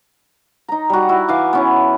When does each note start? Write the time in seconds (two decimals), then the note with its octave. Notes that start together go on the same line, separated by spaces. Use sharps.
0.68 D#4 A#5
0.90 G3 F#4
1.09 E4 F#4
1.28 E3 F5 G#5 D6
1.53 B3 C#4 E4